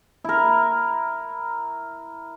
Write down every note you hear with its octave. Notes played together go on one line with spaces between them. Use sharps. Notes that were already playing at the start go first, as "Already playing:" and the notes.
E4 A#4